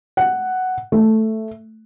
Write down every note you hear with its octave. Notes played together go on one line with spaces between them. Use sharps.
F#5
A3